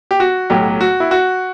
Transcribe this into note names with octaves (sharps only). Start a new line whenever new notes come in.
G4
F#4
B1 A2 F#3 G4
F#4
E4
F#4